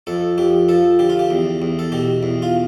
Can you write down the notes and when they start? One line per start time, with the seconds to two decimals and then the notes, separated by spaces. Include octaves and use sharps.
0.07 F2 A4
0.38 F2 G4
0.69 F3 A4
0.99 D3 G4
1.10 F4
1.19 G4
1.30 E2
1.62 E2
1.79 A4
1.92 B2 G4
2.23 E2
2.42 F4